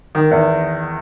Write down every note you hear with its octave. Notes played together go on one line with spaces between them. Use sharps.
D#3
E2